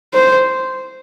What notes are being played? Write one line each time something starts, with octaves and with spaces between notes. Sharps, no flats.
C5